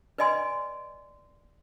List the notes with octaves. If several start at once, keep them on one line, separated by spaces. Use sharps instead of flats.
B4 D5 D#5 G#5 C6